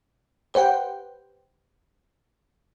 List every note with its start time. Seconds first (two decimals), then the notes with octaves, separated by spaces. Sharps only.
0.54 G4 B4 C5 F#5 G5